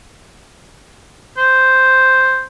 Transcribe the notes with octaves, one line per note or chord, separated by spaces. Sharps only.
C5